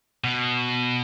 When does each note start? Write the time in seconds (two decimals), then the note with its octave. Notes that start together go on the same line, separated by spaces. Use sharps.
0.24 B2